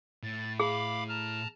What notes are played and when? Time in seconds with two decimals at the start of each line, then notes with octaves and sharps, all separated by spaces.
0.23 A2 A6
0.60 G#4 F5 B5 D6
1.09 A5 A#5 F6